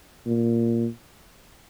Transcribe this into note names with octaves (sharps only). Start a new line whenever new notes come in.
A#2